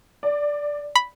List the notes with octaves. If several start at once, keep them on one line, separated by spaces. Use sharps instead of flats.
D5
B5